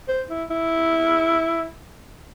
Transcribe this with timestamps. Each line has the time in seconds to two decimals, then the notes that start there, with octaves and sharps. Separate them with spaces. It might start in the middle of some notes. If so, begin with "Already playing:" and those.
0.08 C5
0.30 E4
0.50 E4